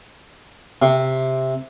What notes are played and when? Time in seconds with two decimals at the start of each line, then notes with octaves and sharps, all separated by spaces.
0.82 C3